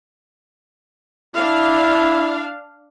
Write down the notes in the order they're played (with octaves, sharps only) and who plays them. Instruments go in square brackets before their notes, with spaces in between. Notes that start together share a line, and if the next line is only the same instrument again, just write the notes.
[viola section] D4 F5 [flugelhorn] E4